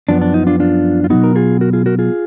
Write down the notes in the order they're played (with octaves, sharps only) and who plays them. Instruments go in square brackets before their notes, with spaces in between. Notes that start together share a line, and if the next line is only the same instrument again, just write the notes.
[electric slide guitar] F#2 F3 B3 D4
D4
D#4
D4 F4
D4 F4
F4
B2 F#3 B3 D#4 F#4
A#4
F4 G#4
F#4 A#4
F4 G#4
F#4 A#4
F4 G#4